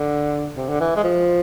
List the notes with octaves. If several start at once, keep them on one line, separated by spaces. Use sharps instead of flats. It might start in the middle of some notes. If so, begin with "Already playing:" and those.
Already playing: D3
C3
D3
E3
G#3
F3